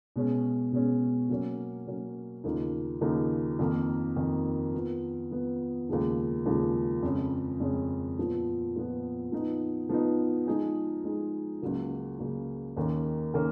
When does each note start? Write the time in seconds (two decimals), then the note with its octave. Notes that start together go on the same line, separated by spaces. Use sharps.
0.16 B2 G#3 C#4
0.72 B2 G#3 C#4
1.30 F#3 A#3 C#4
1.87 F#3 A#3 C#4
2.44 D#2 C#3 F3 A#3 D#4
3.01 D#2 C#3 F3 A#3 D#4
3.59 F2 D#3 A#3
4.16 F2 D#3 A#3
4.74 F3 B3 F4
5.31 F3 B3 F4
5.88 D#2 C#3 F3 G#3
6.45 D#2 C#3 F3 G#3
7.03 F2 C#3 G#3 C#4
7.60 F2 C#3 G#3 C#4
8.18 A#2 F3 B3
8.75 A#2 F3 B3
9.32 F3 B3 D#4
9.89 F3 B3 D#4
10.47 F3 G#3 D#4 G#4
11.04 F3 G#3 D#4 G#4
11.62 C#2 C#3 F#3 A#3
12.19 C#2 C#3 F#3 A#3
12.77 D#2 D#3 A#3 C#4
13.34 D#3 A#3 C#4